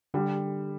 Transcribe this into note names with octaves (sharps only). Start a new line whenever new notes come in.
D3 G3